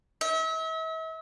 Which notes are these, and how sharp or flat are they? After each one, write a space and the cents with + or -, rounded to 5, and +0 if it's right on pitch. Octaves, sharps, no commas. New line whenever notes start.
E5 -40